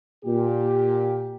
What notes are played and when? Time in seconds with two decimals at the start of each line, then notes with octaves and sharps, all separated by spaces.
0.24 A#2 G4